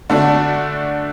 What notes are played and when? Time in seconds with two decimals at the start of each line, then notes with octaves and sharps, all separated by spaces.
0.10 D3 A3 D4 F#4